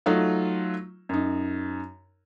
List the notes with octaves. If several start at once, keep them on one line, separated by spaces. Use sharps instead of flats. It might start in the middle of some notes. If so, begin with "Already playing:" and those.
F#3 A3 D#4 F4
F#2 D#4